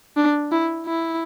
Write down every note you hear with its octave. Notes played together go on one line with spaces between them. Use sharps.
D4
E4
E4